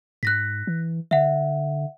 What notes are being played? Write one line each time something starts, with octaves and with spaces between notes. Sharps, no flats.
G#2 F#6 A#6 B6
E3
D3 E5 F#5